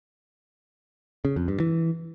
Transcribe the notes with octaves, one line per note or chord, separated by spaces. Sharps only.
C#3
F2
G2
E3